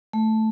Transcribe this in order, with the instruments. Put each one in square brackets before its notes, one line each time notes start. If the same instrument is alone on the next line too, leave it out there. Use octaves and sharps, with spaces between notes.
[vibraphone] A3